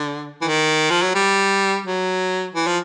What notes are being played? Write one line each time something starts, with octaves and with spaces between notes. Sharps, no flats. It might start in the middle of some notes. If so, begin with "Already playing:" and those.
Already playing: D3
E3
D#3
F3
F#3
G3
F#3
E3
F3